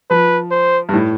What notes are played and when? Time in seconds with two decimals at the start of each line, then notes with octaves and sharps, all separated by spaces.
0.10 F3 B4
0.51 C5
0.89 G2
0.93 A2